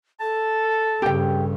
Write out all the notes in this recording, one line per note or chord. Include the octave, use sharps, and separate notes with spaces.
A4 A5
G2 C#3 G4 G5